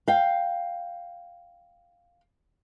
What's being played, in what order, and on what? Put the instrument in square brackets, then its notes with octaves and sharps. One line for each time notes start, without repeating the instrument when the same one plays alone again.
[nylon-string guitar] F5 G5